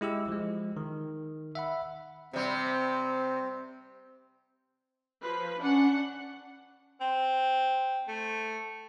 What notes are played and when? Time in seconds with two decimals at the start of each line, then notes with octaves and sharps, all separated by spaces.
0.01 G#3 E4 G4 E6
0.28 F3 G#3
0.77 D#3
1.55 E5 F#5 B5
2.33 C3 G3 C4
5.23 F3 B4
5.60 C#4 D4 F#5
7.01 C4
8.08 A3